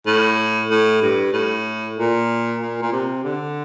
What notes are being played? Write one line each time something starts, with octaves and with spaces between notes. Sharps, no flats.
A2
A2
G2
A2
A#2
A#2
A#2
C3
D3